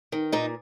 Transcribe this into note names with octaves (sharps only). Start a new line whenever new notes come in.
D#3
A#2 D#4